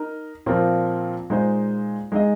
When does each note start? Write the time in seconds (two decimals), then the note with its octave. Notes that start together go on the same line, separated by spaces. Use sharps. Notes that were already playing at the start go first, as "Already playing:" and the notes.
Already playing: D#4 A#4
0.46 A#2 F3 C4 F4 A#4
1.30 A#2 G#3 D#4 C5
2.12 G#3 D#4 G#4 D#5